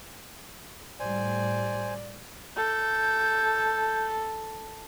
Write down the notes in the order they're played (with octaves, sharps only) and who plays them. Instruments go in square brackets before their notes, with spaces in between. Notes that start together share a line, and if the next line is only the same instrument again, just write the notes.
[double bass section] A2 G3 [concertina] C5 G#5 [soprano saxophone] D5
[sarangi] A4 [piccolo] G6